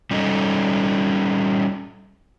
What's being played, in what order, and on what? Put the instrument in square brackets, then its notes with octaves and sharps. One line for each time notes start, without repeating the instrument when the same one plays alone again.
[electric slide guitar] G3 C#4 D#4 A4